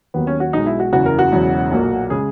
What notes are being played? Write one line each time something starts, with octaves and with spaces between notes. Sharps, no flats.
D#2 D#3 F#3 A#3 B3
C#4
F#4
B1 B2 G#3 D#4
E4
F#4
F#1 E2 C#3 E3 F#4
A#4
F#4
E1 E2 C#3 F#3
B1 A#2 F#3 A#3
C#3 G#3 G#4